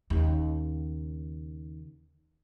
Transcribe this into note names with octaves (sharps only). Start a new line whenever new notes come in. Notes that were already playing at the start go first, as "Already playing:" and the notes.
D#2 C#3